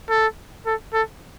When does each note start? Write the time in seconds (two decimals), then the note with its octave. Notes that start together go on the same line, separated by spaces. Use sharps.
0.10 A4
0.66 A4
0.93 A4